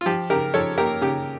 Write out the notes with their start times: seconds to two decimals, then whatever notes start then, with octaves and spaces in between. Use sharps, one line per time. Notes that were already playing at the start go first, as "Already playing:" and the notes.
0.01 F4
0.06 F3 G4
0.30 C#3 G4 A#4
0.54 F3 A4 C#5
0.78 A#3 G4 A#4
1.01 C#3 G4